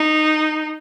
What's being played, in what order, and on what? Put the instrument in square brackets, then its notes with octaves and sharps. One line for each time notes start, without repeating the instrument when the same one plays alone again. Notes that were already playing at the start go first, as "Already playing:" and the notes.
Already playing: [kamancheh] D#4